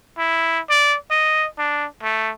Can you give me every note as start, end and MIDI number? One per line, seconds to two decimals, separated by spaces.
0.18 0.60 64
0.70 0.96 74
1.10 1.47 75
1.59 1.86 62
2.02 2.31 57